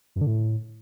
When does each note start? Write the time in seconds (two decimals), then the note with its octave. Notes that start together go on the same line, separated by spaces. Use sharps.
0.16 F#2
0.21 D3
0.27 A2